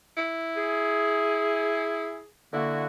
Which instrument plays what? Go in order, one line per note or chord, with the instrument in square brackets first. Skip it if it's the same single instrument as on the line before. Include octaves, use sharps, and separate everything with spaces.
[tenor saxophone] E4
[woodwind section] G#4
[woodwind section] D3 A#3 F#4 [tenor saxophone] E4